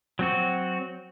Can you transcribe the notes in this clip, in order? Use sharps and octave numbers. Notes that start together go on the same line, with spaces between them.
F#3 C4 F#4